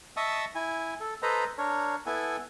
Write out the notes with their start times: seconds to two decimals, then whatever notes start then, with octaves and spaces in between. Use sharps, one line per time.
0.17 D#5 E5 A5 C#6 D#6 E6
0.55 E4 G#5
1.00 A4
1.23 A4 B4 C5 D#5 A#5
1.58 D4 A#4 C#5
2.06 B3 E4 A4 G#5